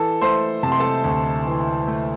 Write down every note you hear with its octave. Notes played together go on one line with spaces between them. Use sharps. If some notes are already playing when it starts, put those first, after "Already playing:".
Already playing: E3 A4
A3 C5 C6
C3 A5
C6
A4 A5
D2
E3
A3